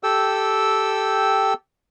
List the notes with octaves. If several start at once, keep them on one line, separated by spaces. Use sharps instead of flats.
G4 A4 G5 E6